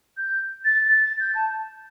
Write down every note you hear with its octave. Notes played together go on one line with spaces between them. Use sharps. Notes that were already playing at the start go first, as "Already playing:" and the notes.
G6
A6
A6
A6
G6
A5